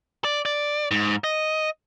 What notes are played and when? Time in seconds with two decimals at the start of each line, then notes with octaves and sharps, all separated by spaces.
0.24 D5
0.46 D5
0.91 G#2
1.24 D#5